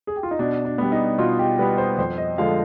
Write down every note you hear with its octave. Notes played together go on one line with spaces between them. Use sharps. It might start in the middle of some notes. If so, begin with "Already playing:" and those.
G#4
G4
F4
D#4
B2 D4
D4
G3 B3
D#4
B2 F4
G4
G3 B3 B4
C5
F2 C5
D#5
D3 F3 G#3 F5